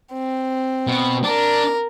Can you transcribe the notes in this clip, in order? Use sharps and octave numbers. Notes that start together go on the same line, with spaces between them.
C4
B2
D4 A#4